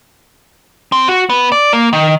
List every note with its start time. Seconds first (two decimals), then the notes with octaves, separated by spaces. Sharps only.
0.92 C4
1.08 F#4
1.30 B3
1.52 D5
1.73 A#3
1.93 D#3